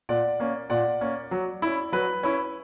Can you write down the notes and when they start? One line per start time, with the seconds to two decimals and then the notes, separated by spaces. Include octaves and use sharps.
0.09 A#2 D5 F#5
0.40 A#3 C#4
0.70 A#2 D5 F#5
1.01 A#3 C#4
1.31 F#3
1.62 C#4 E4
1.92 F#3 B4
2.23 C#4 E4